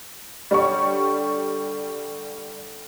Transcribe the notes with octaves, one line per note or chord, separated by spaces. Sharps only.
D3 G3 C#5 G5 C#6